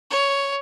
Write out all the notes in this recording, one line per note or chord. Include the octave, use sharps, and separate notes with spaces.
C#5